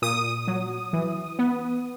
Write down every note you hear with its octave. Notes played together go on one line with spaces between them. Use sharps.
A#2 D#6
F#3
E3
B3